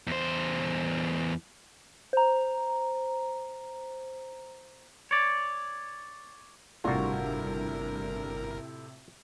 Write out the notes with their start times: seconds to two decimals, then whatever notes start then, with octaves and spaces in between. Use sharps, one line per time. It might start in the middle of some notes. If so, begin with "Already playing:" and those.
0.07 E2 C5
2.13 C5 A#5
5.11 C#5 D5
6.84 G1 A2 C3 G3 D4 F4 F#4 A#4